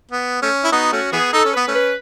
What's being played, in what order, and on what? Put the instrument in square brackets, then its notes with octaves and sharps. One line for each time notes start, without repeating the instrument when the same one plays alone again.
[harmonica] B3
A3 C#4
E4
[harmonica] B3 D#4 [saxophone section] F#4
[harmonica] A3 C#4 [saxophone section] F#4
[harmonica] E3 B3 [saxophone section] G#4
[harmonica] D#4 [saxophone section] A4
[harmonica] C#4
[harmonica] B3 [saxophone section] B4
[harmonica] A3 C#4
[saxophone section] B4